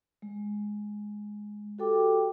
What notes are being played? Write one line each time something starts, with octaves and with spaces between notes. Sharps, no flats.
G#3
F#4 G4 A4 G5 D6